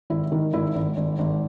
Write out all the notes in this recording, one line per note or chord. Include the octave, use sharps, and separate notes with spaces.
G#1 E4
D#3
G#1 E4
G#1
G#1
G#1